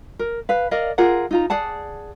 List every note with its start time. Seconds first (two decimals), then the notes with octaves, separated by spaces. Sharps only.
0.19 A#4
0.49 B4 F5
0.71 A#4 D5 D#5 F5
0.98 F4 G#4 A#4 F#5
1.31 D#4 F4 A#5
1.50 G#4 D5 F#5 A5